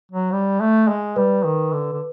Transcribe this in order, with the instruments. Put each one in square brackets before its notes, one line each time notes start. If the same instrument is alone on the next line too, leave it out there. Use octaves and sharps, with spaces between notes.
[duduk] F#3
G3
A3
G#3
[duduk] G3 [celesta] B4
[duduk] D#3
D3
D3